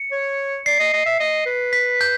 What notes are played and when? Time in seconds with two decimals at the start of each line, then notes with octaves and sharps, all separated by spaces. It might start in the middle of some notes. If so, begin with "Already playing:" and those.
Already playing: C#7
0.12 C#5
0.66 D5 C7
0.79 D#5
0.93 D#5
1.06 E5
1.20 D#5
1.46 B4
1.73 B6
2.01 G6